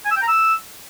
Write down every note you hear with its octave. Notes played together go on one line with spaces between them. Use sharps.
G#5
E6
G5
A#5
E6